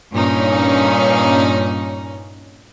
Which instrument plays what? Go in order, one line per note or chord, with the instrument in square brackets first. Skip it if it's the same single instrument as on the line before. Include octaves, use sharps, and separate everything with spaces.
[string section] G2 A#2 C#4 D#4